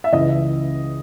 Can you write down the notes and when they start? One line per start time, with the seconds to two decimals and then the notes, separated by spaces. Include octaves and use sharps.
0.04 E5
0.13 C#2 C#3 E3 D#5